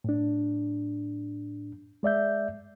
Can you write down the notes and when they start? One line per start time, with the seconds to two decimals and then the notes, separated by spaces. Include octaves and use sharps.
0.04 A2 D4
2.03 G#3 D5 E5 G6